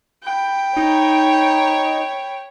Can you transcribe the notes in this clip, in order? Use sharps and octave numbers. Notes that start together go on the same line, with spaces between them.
G5 B5
D#4 C#5